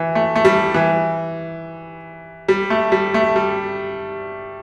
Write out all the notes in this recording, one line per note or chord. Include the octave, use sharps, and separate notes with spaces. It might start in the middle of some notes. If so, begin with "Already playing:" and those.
Already playing: E3
A3
A3
G3
E3
G3
A3
G3
A3
G3